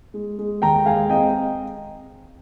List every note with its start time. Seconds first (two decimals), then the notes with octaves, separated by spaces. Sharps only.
0.14 G#3
0.39 G#3
0.62 D#2 G5 A#5
0.86 G#3 F5 G#5
1.10 C4 D#5 G5